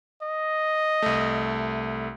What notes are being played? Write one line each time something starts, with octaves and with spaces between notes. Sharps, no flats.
D#5
C2 A3